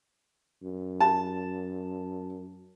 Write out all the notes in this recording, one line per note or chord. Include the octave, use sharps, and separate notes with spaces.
F#2
A5